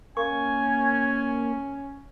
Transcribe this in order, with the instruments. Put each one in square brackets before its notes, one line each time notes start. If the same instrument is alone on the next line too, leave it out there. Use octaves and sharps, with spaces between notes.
[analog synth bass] A#3 [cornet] C#4 [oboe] G#5 [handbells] C#6